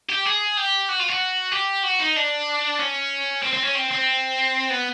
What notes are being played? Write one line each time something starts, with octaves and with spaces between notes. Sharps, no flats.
G4
G#4
G4
F#4
F4
F#4
G4
F#4
D#4
D4
C#4
C4
C4
C#4
C4
C4
B3